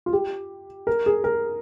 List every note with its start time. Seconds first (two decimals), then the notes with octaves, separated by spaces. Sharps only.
0.06 F4
0.13 G4
0.87 A#4
1.06 G#4
1.24 A#4